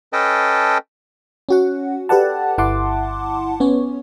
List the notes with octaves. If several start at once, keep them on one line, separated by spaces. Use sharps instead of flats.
C#4 A4 B4 D#5 G5 A5
C#4 F#4 F#5
G4 A4 B4 D5 F#5 A5
G1 E4 F#5 A5 C6 D6
B3 C#4 C#5